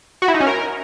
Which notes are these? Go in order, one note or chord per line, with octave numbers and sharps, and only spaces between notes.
F#4
E4
D#4
C#4
A#4